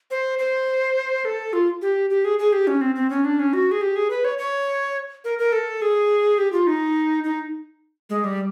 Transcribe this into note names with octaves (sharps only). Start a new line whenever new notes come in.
C5
C5
A4
F4
G4
G4
G#4
G#4
G4
C#4
C4
C4
C#4
D4
C#4
F#4
G#4
G4
G#4
B4
C#5
C#5
A#4
A#4
A4
G#4
G4
F4
D#4
D#4
G#3
G3